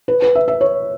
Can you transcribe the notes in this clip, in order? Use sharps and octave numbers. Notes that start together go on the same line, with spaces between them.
B4
B4
E5
E5
C#5